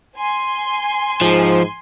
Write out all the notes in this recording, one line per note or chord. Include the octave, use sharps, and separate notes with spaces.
G#5 C6
G#2 F3